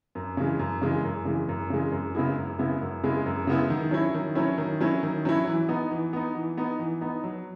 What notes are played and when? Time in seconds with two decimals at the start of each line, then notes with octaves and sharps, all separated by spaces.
0.15 F#2
0.37 C#3 E3 G#3
0.59 F#2
0.81 C#3 E3 G#3
1.04 F#2
1.25 C#3 E3 G#3
1.49 F#2
1.70 C#3 E3 G#3
1.92 F#2
2.14 C#3 G#3 B3 E4
2.37 F#2
2.59 C#3 G#3 B3 E4
2.81 F#2
3.03 C#3 G#3 B3 E4
3.26 F#2
3.47 C#3 G#3 B3 E4
3.70 D#3
3.91 F#3 C#4 E4
4.14 D#3
4.35 F#3 C#4 E4
4.58 D#3
4.80 F#3 C#4 E4
5.03 D#3
5.25 F#3 C#4 E4
5.47 E3
5.68 B3 D#4
5.91 E3
6.13 B3 D#4
6.35 E3
6.58 B3 D#4
6.79 E3
7.01 B3 D#4
7.24 F#3